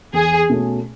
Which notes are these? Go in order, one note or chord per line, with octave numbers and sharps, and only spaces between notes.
E2 G#4
B2 A3 C#4